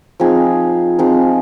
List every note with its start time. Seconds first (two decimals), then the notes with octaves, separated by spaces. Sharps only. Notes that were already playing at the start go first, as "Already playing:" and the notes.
0.20 F3 C4 D#4 G#4
0.99 F3 C4 D#4 G#4